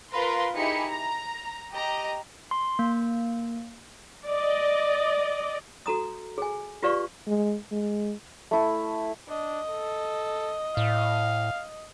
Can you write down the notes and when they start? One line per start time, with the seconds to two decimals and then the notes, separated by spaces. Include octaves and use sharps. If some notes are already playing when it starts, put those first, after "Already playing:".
0.12 F4 A#4 B4 F5 A#5 C6
0.55 D#4 E4 G4 G#4 C#7
0.88 A#5
1.72 G4 D#5 A#5
2.51 C6
2.79 A#3
4.26 D5 D#5
5.86 F#4 A4 A#5 D#6
6.38 G#4 G#5
6.83 F4 G4 B4 D5 F5 C#6
7.27 G#3
7.71 G#3
8.51 A3 E4
9.28 D4 D#5
9.70 A4
10.77 A2 F5